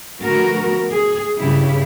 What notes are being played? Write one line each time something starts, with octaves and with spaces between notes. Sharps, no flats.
D3 F3 A3 B3 F#4 A#4
G#4
G2 C#3 E4 G4